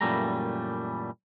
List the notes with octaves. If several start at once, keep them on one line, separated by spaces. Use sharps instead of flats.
F#2 A#2 E3 G3 A3 A#5